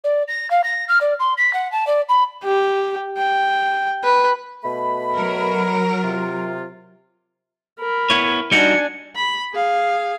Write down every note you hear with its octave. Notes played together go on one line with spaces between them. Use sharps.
D5
A#6
F5
A#6
F6
D5
C6
B6
F#5
A5
D5
B5
G4
G5
B4
B2 A3 B5
F#3 A#4
C3 F4
A#4 B5
B3 E4 C#5
G3 D4 D#4 F#4 G#5 C#7
B5
G#4 F5